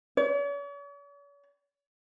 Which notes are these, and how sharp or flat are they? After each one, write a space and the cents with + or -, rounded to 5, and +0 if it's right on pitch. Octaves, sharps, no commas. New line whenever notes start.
C#5 +45